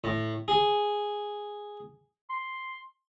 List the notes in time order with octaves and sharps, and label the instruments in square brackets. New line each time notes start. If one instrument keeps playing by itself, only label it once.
[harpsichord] A2
G#4
[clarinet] C6